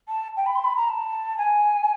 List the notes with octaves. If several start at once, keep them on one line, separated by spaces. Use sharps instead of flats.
A5
G5
B5
C6
B5
A#5
A5
G#5